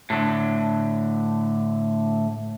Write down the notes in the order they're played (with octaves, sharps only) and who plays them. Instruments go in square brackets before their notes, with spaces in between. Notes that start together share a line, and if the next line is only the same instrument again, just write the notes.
[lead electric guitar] A2 D3